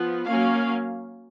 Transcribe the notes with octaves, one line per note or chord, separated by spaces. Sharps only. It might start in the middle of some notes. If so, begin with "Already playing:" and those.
Already playing: F3 B3
F#3 A#3 C#4 F5